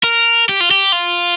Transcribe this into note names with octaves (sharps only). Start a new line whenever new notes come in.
A#4
G4
F4
G4
F4